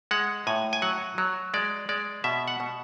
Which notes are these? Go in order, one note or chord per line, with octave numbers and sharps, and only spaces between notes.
G#3 F#5
A2 G#5
G#5
F#3 F#5
F#3
G#3 D5
G#3 D5
B2 E5
F#5
B2